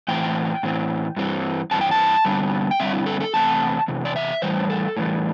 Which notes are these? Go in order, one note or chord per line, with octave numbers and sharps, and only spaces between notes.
A2 E3 C4 G5
A2 E3 C4
G2 E3 G3 C4
G2 E3 G3 C4 A5
G5
A5
G2 D3 G3 C4
G5
G2 D3 G3 C4 E5
E4
A4
A4
E2 C3 A3 C4 A5
E2 C3
D5
E5
A2 E3 G3 C5
A4
A2 E3 G3